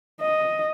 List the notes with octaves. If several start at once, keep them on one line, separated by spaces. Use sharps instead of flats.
D#5